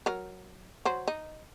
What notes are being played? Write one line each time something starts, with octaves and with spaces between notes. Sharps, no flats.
F#3 A#4
F#3 C5
D#4